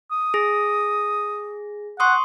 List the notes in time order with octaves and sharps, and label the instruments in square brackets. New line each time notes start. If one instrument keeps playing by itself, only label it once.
[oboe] D#6
[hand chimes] G#4 A#6
[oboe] F#5 [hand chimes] C6 C#6 D#6